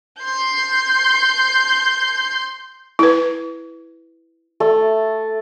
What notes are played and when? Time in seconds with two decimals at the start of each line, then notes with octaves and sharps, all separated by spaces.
0.20 C6 G6
2.99 E4 B4
4.60 A3